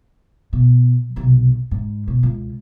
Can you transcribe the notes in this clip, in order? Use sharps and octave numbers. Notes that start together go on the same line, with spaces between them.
B2
B1 C3
G#2
B2
C#2